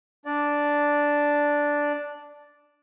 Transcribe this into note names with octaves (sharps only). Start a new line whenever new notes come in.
D4 D5